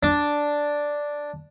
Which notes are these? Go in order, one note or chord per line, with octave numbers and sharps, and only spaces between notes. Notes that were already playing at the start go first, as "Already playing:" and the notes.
D4